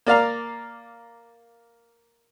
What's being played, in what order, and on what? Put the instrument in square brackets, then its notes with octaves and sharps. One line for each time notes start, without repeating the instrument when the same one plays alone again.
[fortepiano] A#3 D5 F5 A#5